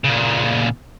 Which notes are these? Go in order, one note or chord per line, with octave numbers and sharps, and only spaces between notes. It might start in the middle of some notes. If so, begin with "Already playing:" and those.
A#2 C#3